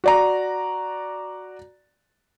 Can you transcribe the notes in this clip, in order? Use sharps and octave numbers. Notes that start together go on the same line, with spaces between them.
F#4 D5 A#5